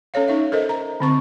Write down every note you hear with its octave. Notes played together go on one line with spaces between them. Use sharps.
C#4 A4 C#5 F5
C#4 D#4 E5
A4 A#4 C5 D#5
A#5
D3 C4 C#6